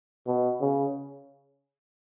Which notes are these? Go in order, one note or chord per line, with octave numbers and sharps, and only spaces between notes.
B2
C#3